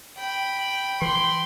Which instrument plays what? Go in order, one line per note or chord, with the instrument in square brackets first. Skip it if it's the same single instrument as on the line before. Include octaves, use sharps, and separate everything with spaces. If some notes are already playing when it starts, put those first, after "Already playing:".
[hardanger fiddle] G5 B5
[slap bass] E3 [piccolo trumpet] C6